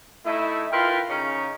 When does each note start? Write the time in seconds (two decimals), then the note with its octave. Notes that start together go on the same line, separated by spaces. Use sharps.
0.25 A3 D#4 E4
0.72 E4 F4 A#4 B4 G5 C6
1.10 C#3 C#4 D#4